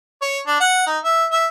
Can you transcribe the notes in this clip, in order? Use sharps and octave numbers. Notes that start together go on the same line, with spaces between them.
C#5
D4
F#5
D#4
E5
E5